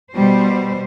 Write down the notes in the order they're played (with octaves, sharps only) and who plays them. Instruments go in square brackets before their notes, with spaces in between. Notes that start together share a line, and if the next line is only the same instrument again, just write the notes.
[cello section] B2 G3 C5